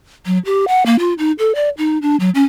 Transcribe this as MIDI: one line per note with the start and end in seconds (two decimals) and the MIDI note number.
0.26 0.38 54
0.45 0.65 67
0.68 0.83 78
0.86 0.96 58
0.99 1.14 65
1.18 1.32 63
1.39 1.52 69
1.55 1.69 74
1.78 1.98 63
2.02 2.16 62
2.20 2.30 54
2.35 2.43 61